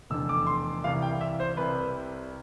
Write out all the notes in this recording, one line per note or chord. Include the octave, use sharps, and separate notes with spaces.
F1 E2 D3 E6
D6
C6
C2 C3 E3 G3 F5
G5
E5
C5
C2 C3 G3 B4